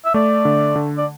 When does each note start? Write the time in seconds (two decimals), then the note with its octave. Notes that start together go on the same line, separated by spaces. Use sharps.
0.05 E5
0.14 A3 D5
0.45 D3
0.76 D3
0.98 D5